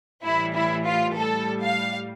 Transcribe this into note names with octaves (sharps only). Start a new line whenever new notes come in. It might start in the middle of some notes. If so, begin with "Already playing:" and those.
A2 E3 G3 E4
E4
F4
A2 G3 A4
F5